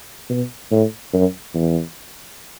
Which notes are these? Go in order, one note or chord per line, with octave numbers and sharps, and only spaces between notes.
B2
A2
F#2
E2